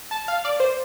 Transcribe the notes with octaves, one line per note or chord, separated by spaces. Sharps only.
A5
F5
D5
C5